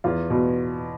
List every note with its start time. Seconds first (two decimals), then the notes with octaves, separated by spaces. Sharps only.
0.04 E2 F4
0.30 B2